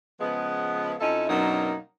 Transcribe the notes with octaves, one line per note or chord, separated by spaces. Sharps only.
C#3 F3 G#3 B3
F2 C#4 D#4 E4 A4 E5
F#2 B2 F#3 A#3 D4 D#4